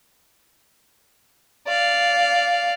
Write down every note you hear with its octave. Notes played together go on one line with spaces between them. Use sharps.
D5 F5